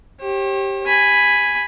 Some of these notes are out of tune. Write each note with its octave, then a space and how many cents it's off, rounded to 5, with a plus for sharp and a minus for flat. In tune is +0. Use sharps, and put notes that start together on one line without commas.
G4 +0 C#5 -45
G#5 +0 B5 +0